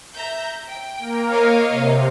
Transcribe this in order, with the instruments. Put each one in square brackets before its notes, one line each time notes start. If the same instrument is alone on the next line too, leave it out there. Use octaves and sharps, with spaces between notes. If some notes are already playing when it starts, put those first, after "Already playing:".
[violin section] E5 A#5 G6
G5
[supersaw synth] A#3 A#4
[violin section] C#5 D#5 F5
[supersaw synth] C3